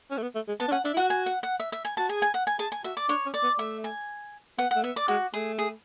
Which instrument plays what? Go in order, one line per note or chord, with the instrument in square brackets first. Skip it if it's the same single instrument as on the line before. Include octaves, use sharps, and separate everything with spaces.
[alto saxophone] C#4
A3
B3
A3
G#3
[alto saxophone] B3 [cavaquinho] A5
[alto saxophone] D4
[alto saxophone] C#4 [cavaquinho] F#5
[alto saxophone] D4 [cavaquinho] E5
[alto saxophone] E4
[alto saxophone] F#4 [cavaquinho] F#5
[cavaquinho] G#5
F#5
F#5
E5
E5
G#5
[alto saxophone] F#4 [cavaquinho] A5
[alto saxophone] G#4 [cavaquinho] G#5
[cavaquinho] G#5
F#5
G#5
[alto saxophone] G#4 [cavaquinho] A5
[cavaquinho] G#5
[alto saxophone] F#4 [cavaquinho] E5
[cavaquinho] D5
[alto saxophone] D4 [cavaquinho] C#5
[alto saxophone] C#4
[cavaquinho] D5
[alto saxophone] B3
[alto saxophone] A3 [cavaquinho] E5
[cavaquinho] G#5
[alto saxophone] B3 [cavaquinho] F#5
[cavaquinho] F#5
[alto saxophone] A3
[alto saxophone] B3 [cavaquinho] E5
[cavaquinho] D5
[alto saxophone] G#3 [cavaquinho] F#4
[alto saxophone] A3 [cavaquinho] G#4
[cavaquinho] G#4